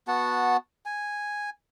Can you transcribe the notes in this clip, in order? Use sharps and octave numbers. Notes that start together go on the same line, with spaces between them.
B3 F#4 F#5 A5
G#5